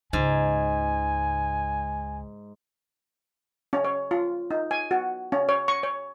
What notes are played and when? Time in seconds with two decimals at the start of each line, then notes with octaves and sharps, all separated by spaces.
0.13 C#2 G#2 C#3 G#5
3.73 C#4
3.85 C#5
4.11 F4
4.51 D#4
4.71 G#5
4.91 F#4
5.32 C#4
5.49 C#5
5.68 C#6
5.83 C#5